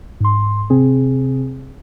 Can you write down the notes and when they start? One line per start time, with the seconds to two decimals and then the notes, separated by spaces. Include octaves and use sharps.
0.20 G#2 C6
0.70 C3 C4 G#4